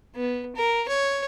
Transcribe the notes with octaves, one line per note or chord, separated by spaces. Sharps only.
B3
A#4
C#5